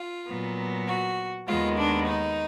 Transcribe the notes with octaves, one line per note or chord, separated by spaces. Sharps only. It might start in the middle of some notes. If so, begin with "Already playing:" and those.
Already playing: F4
A#2 F#3 B3
F#4
D#2 D#3 G#3 B3 F4
D4
D#4